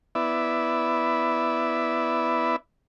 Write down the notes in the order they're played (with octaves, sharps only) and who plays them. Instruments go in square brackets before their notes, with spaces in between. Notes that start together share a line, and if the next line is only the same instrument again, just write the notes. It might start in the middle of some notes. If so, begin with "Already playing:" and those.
[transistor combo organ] B3 E4 D5 E5